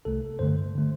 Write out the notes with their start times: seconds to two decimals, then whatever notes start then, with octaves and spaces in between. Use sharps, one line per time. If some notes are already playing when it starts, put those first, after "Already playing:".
0.05 C2 C3 A3 A4
0.39 G2 D3 A3 C5
0.75 D3 A3